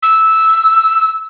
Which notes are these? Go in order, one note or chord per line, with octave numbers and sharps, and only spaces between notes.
E6